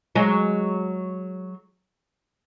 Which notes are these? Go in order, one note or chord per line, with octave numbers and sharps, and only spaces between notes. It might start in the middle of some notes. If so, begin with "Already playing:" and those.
F#3 G#3